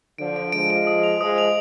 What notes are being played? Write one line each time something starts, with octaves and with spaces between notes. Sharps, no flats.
D3 F3 D7
D7
F3 G#3 D7
D7
D#6
F7
F3 G#3 D#6
F7